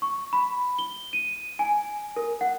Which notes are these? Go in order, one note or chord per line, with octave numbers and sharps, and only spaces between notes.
C#6
B5
G7
D#7
G#5
A#4
F#5